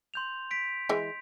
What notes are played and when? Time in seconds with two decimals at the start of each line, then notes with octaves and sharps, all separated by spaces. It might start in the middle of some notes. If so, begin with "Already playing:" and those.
0.14 C6 G6 F7
0.51 B6 D7
0.89 E3 G#3